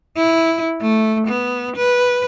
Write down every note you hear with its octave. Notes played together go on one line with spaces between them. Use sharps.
E4
A3
B3
B4